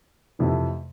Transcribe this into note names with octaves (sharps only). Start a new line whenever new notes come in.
F2 C3 E3 A3